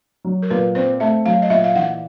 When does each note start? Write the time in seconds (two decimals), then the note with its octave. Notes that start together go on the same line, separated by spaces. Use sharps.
0.25 F#3
0.42 A#4
0.50 A#2 B4
0.75 C4 C5
1.00 A3 E5
1.26 F#3 F5
1.42 D#5
1.50 A#2 E5
1.64 F5
1.75 E3 F#5